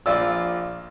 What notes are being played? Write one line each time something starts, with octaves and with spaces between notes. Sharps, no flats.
A#1 F4 D5 E6